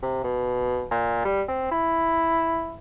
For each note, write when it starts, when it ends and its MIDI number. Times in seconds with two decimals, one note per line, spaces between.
0.03 0.22 48
0.24 0.86 47
0.91 1.23 46
1.25 1.42 55
1.48 1.69 60
1.71 2.77 64